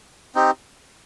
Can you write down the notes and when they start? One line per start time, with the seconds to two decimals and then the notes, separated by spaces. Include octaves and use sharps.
0.35 C4 D#4 G4